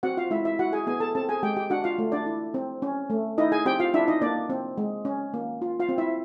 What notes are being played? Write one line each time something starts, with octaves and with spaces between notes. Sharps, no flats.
C4 F#4 F#5
F4 F5
G#3 E4 E5
E4 E5
E4 F#4 F#5
G#4 G#5
B3 G#4 G#5
A4 A5
C4 A4 A5
G#4 G#5
G#3 G4 G5
G4 G5
D4 F#4 F#5
F4 F5
A3
D4 D5
E4
C4
C#4
A3
D#4 E4 D#5
G#4 G#5
C4 G4 G5
F4 F5
D4 E4 E5
D#4 D#5
A#3 D4 D5
C4
G#3
C#4
A#3
F4
F4 F5
C4
E4 E5